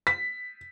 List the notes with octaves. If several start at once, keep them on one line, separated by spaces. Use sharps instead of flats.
B6